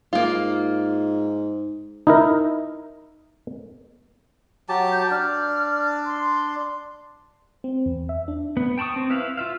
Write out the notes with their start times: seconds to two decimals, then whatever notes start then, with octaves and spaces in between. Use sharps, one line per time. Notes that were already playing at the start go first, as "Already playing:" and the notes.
0.13 G#2 A#3 F4
2.07 D#4 E4 A#4
4.69 F#3 G4 A5
4.92 G6
5.11 D4 F6
6.06 C6
7.64 C4
7.86 E2
8.09 E5
8.28 D4
8.57 B3
8.78 G5 A5 B5 C#6 D#6
8.96 C4
9.10 E4 B4 E5 F5
9.37 F4 E5 F5